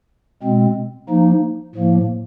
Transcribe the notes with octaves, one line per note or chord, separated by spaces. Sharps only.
B2 G#3 C4
F3 A#3 D#4
A2 F3 A#3